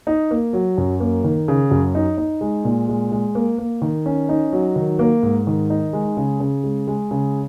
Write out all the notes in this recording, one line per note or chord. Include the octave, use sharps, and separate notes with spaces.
D#4
A#3
F#3
F#2
A#3
D#3
C#3
F#2
D#4
D#4
G#3
A#2
G#3
G#3
A#3
A#3
D#3
C#4
D#4
F#3
D#3
A#3
G#2
D#3
D#4
G#3
C#3
C#3
G#3
G#3
C#3